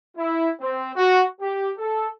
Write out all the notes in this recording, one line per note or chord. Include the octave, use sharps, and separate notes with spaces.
E4
C4
F#4
G4
A4